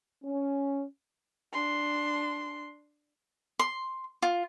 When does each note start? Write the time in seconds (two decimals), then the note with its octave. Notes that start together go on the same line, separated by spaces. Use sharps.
0.24 C#4
1.53 D4 C6
3.59 C6
4.22 F4